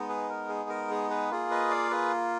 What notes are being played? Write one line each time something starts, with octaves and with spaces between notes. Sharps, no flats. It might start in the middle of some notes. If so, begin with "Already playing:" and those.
Already playing: G#3 B3 D#4
G#4 B4
A#4
G#4
A#4
G#4
G#4 B4
A#3 F4 G#4
B4 D#5
D5 F5
G#4 B4